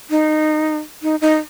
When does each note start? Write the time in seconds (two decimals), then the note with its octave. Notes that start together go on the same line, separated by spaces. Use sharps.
0.10 D#4
1.03 D#4
1.21 D#4